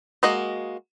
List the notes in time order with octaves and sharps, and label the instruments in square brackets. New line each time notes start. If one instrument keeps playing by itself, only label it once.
[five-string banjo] G#3 A#3 F#4 D#5